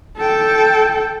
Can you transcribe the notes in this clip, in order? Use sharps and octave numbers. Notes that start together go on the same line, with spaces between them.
A4 G5